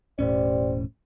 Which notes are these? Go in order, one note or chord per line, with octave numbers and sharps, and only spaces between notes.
E1 A2 C#4 G4 C5 D5